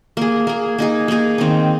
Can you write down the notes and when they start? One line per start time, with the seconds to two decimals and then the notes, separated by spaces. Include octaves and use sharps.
0.17 A#3 G#4
0.47 A#3 G#4
0.78 A#3 D#4 G#4
1.08 A#3 D#4 G#4
1.38 D#3 C4 D#4